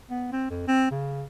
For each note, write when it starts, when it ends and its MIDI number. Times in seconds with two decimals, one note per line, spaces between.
0.11 0.29 59
0.33 0.50 60
0.50 0.68 41
0.68 0.89 60
0.91 1.24 49